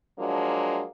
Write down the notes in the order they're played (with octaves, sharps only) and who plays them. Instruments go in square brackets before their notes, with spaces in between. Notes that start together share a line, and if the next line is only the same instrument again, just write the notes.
[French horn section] F3 F#3 G#3 A#3 D4